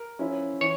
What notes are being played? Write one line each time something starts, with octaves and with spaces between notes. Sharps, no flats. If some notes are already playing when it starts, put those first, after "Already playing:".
Already playing: A#4
F3 C#4 E4
E3 C#5